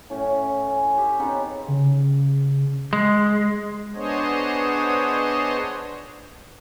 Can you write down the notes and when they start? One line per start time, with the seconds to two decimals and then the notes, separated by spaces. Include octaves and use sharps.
0.10 A2 C#4
0.67 G#5
0.98 G4 E5
1.19 C#3 B3 C4 D#4
1.68 C#3
2.93 G#3
3.95 B3 D4 G#4 C5 C#5 D#5